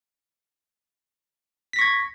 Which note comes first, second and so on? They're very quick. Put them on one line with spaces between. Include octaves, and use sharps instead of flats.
B6 A#6 C#6 G#6